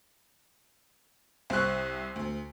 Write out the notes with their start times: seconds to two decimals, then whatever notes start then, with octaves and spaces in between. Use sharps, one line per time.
1.50 C2 C4 C#6 F#6
2.16 D2